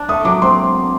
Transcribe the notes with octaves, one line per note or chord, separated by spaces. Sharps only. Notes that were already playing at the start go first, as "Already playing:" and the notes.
Already playing: D4
A3 D#6
F#3 D6
C4 C6